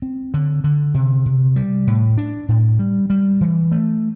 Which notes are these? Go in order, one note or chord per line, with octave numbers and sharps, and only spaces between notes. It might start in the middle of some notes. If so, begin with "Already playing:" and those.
C4
D3
D3
C3
C3
G3
A2
D4
A2
G3
G3
E3
A3